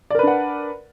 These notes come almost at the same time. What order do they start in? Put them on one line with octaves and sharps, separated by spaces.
D5 A#4 B4 D4 F#5